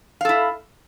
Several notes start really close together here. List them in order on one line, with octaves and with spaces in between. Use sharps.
F5 A4 E4